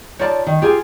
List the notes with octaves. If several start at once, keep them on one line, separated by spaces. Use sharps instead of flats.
D#4 F4 C#5 D5 A5
D#3
F4 G4 G#4 G#5